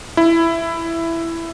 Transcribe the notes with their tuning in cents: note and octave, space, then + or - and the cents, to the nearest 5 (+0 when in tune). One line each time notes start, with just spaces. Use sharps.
E4 +10